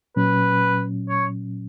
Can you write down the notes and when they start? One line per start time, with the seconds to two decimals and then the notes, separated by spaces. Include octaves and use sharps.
0.16 A#2 F#3 C#4 B4
1.09 C#5